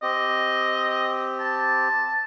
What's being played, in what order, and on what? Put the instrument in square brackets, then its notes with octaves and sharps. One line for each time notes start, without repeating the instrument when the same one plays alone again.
[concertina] C4 G4 [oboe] D#5
[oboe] A5